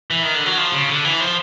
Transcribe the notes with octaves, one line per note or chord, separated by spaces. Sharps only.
E3
D#3
D3
F#3
F3
C#3
D3
E3
F3